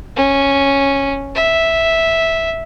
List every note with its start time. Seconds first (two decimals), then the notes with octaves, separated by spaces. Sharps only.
0.17 C#4
1.35 E5